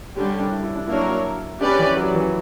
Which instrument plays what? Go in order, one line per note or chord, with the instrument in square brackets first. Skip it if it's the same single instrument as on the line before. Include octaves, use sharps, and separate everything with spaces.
[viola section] D3 G3 C#4 G4
[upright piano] D4
E4
E4
D4
[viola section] F#3 A#3 D4 A#4 C#5 [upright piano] E4
[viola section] C#4 G4 B4 D5 [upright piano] D4
[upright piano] E3
F#3
E3